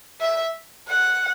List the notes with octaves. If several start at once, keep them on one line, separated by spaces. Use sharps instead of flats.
E5
F#5